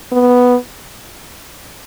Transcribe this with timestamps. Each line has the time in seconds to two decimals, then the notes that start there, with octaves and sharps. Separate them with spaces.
0.12 B3